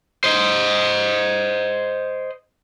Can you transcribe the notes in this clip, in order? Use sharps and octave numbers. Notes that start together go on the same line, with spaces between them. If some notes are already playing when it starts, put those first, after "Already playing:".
C5 D#5